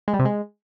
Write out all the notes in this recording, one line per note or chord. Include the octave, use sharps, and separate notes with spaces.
G#3
G3
C3
G#3